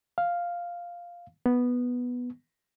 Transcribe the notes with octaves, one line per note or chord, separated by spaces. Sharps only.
F5
B3